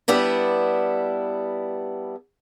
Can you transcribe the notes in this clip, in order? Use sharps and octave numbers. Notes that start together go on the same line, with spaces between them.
G3 B3 D4 E4